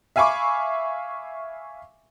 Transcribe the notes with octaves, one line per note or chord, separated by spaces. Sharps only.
E5 F5 G#5 B5 C#6 D6